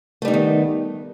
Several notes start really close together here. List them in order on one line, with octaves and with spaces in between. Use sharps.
A3 G3 D#4 B3 D#3